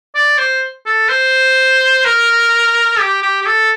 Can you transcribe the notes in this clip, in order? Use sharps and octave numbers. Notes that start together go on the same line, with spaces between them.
D5
C5
A4
C5
A#4
G4
G4
G4
A4